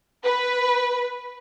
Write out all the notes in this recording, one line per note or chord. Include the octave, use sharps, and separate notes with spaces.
B4